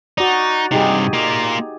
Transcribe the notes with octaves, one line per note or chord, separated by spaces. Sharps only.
D#4 F#4 D5
G2 C3 D#4 G4 G#4
A#3 F4